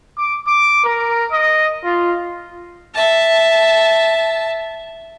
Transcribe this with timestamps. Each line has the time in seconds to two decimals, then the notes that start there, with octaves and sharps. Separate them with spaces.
0.18 D6
0.47 D6
0.85 A#4
1.32 D#5
1.84 F4
2.94 E5 A5